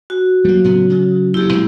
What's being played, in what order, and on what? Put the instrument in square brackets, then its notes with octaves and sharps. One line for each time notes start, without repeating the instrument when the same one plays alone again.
[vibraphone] F#4
[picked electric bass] F#3 [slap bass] G3 A#3
[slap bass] A2 C#3 B3
C#3
[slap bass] F#1 F2 [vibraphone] E4 G4
[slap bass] A#2 G#3 C4